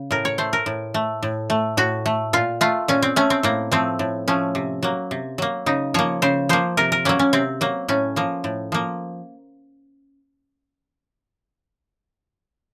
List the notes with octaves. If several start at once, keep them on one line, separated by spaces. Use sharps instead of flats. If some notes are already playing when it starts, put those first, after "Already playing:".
Already playing: C#3
A2 A#4
C#5
A3 C5
A#4
A2
A3
A2
A3
A2 F#4
A3
A#2 F4
A3 F4
A#2 C#4
C4
A3 C#4
C4
A2 A#3
F3 A3 C4
A2
F3 A3 C#4
C3
F#3 A#3
C3
F#3 A#3
C#3 D#4
F3 A#3 C#5
C#3 C5
F3 A#3 C5
C3 A#4
A#4
F#3 A#3 C#4
C#4
C3 C4
F#3 A#3
A2 C#4
F3 A#3
A2
F3 A#3